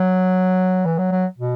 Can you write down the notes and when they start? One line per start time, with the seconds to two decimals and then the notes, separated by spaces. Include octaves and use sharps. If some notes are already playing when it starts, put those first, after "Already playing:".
Already playing: F#3
0.85 E3
0.98 F#3
1.12 F#3
1.38 B2